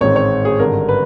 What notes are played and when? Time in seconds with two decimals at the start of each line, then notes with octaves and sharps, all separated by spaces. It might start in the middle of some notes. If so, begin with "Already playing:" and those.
0.01 A1 G#2 D#3 G#3 C4 C#5
0.16 C#5
0.45 G#4
0.59 G#1 G2 D3 A#4
0.89 B4